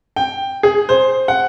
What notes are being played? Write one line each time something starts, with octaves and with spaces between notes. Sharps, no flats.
G5
G#4
C5
F#5